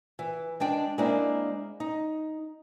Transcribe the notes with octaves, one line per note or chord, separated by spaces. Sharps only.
E3
G#3 D4 G5
G#3 A#3 C4 D4 E4
D#4